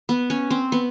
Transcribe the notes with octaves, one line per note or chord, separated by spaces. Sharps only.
B3
C#4
C4
B3